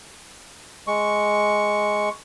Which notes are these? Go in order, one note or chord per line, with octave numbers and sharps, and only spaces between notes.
G#3 C#6